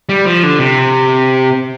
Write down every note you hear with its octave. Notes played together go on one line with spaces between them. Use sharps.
G3
F3
D3
C3